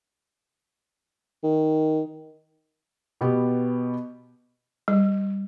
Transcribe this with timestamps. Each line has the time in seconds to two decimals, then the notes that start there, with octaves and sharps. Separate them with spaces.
1.44 D#3
3.21 B2 B3 G4
4.88 G3